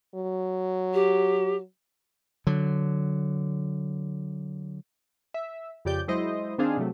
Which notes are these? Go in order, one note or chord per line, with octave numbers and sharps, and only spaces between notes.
F#3
G4
D3 F#3
E5
F2 C#3 G4 D5 G6
F#3 G#3 E4 C5 D#5
D#3 C4 D4 G#4 F5
C3 F#3 A3